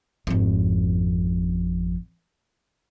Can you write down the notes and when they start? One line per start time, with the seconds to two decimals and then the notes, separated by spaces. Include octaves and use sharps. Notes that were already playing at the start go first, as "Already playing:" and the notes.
0.27 G#1 F2